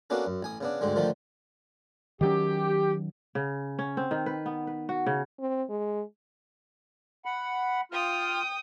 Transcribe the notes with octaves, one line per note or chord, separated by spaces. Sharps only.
A#3 B3 C#4 D4 F#4 A4
F#2
A1 G#5 D#6
C#3 B3 D4
D2 G#2 D3 G3 G#3
D3 D#3 F3 G3 A3
D#3 F#3 C#4 G4
C#3
C#4
C4
D#3
B4
B3
B4
F#4
C#3
C4
G#3
F#5 B5
F4 G5 D#6 F6